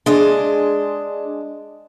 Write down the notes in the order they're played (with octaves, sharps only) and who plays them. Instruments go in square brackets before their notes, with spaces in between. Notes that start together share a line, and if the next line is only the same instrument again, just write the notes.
[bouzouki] G#3 D#5 [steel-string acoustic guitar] D4